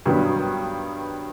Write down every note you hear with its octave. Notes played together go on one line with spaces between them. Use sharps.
G2 D#3 F#3 B3